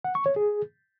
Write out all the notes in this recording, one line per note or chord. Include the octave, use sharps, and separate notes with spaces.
F#5
C#6
C#5
G#4